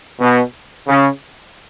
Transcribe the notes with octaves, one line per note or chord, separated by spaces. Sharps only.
B2
C#3